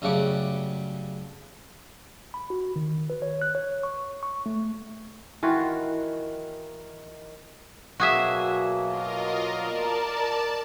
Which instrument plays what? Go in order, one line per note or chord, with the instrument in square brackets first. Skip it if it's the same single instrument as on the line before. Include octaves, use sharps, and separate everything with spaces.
[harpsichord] F#2 C#3 G3 A3 F#5 D6
[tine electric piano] B5
F#4
D#3
B4
C#5
F#6
C#5
C#6
C#6
A3
[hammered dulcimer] D#3 [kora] E3 F4 F#4
[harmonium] B2 F#3 A#3 [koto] F#4 G#4 E5
[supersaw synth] F4 A#4 D#5
[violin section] A#4 [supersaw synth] D5 A5